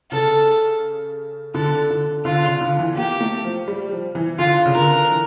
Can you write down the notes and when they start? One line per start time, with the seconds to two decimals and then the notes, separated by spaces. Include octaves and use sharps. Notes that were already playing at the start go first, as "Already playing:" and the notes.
0.11 C#3 A4
1.54 D3 A4
1.90 D3
2.25 D3 F4
2.43 C#3
2.61 D3
2.79 E3
2.96 A#3 G4
3.21 A3
3.44 F3
3.68 G3
3.92 F3
4.15 E3
4.39 D3 F4
4.66 C#3
4.75 D3 A#4
5.11 E3